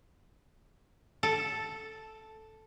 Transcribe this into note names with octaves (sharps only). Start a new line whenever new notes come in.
A4